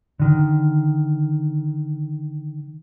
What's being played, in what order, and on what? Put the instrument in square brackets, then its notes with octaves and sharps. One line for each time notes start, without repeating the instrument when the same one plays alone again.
[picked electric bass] D3 D#3